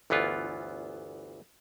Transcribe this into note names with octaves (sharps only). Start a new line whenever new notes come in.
G1 D2 E3 B3 F4